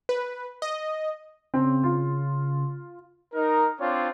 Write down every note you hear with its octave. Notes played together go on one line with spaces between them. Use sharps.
B4
D#5
C#3 C4
F4
D#4 A#4
C4 D4 F4 C#5 D5